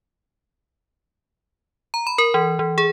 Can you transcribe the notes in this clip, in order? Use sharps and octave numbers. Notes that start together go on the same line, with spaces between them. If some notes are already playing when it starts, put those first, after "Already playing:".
A#5
B5
A#4
E3
E3
G#4